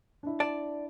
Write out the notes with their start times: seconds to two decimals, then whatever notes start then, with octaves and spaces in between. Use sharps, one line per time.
0.23 D4 E4
0.40 D5 A5